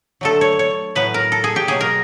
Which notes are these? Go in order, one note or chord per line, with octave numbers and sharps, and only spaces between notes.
D3 F#3 A3 A4
C#5
C#5
A2 F#3 B3 B4
A#4
A4
G#4
G4
B2 F#3 A#3 G#4
A#4